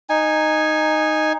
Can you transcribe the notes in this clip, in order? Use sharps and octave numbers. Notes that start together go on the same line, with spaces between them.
D#4 G#5